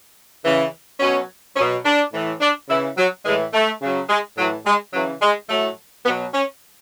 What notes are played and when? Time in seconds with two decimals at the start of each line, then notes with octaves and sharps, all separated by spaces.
0.44 C#3 E3
1.00 B2 F#3 C#4
1.56 B2 F#3 C#4
1.85 D4
2.13 A2 E3
2.41 D4
2.69 C#3 E3 E4
2.97 F#3
3.25 A2 E3 G#3
3.53 A3
3.81 C#3 F#3
4.09 G#3
4.37 A2 E3 F#3
4.65 G#3
4.93 C#3 E3 F#3
5.21 G#3
5.49 A2 F#3 A3
6.06 B2 B3
6.09 F#3
6.33 C#4